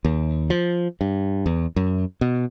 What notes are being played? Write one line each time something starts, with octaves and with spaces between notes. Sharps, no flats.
D#2
F3
G2
E2
F#2
B2